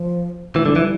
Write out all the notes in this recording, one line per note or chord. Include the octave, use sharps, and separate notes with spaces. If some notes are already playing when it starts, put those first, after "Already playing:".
Already playing: F3
E3 A3
D3 G3
E3 F3
G3